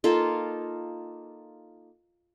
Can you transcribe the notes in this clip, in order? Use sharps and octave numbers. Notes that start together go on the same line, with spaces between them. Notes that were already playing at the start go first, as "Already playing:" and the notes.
A#3 D#4 F4 A4